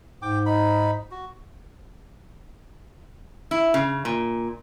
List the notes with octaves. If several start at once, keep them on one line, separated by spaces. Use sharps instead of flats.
G#2 G5 D6
D#4 B5
F#4
E4
C#3
A#2